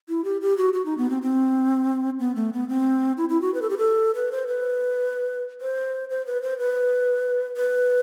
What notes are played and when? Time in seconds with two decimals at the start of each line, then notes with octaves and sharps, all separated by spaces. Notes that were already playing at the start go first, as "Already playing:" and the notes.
0.09 E4
0.24 G4
0.41 G4
0.57 F#4
0.73 F#4
0.85 D#4
0.98 B3
1.10 C4
1.22 C4
2.19 B3
2.36 A3
2.53 B3
2.69 C4
3.17 E4
3.29 E4
3.42 F#4
3.54 B4
3.62 A4
3.70 G4
3.78 A4
4.15 B4
4.32 C5
4.47 B4
5.61 C5
6.10 C5
6.27 B4
6.43 C5
6.59 B4
7.56 B4